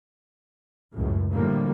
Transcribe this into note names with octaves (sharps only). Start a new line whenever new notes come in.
C#2 F#2 A2
A2 D3 F3 G3 A#3